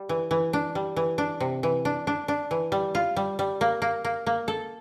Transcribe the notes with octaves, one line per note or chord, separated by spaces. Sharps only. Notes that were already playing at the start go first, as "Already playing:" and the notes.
Already playing: G3
E3
E3
D4
G3
E3
D4
C3
E3
D4
D4
D4
E3
G3
F4
G3
G3
A#3
A#3
A#3
A#3
A4